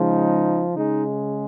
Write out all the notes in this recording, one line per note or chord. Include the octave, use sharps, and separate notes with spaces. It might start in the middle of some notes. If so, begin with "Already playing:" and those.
Already playing: C#3 F3 G#3 D#4
C#3 G#3 D#4